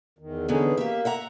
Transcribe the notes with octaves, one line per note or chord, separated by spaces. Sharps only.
E2 D#3
D3 E3 B3 C#4 D#4 G#4
A#3 G4 E5
E5 F#5 A#5